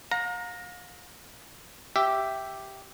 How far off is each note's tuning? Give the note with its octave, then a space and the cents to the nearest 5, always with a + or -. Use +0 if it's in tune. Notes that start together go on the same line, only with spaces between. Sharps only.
F5 +40 A#5 +0
G4 -5 E5 +5